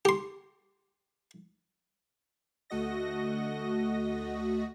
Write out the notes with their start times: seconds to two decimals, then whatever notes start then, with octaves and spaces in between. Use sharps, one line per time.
0.05 G4 C6
2.70 D2 A3 F#4 D#5 A#6